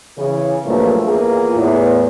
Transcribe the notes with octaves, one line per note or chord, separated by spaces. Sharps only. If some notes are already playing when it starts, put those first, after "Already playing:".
C#3 E3
G2 A#2 F3 F#3 A3 A#3
E2 A#3 F4 G#4
E2 A2